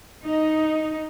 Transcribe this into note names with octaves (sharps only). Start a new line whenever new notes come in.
D#4